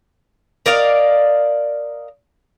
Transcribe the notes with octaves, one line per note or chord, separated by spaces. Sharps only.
A#4 D5 D#5 F5